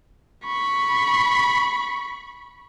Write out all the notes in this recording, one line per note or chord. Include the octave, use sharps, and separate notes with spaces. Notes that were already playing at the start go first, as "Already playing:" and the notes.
B5 C#6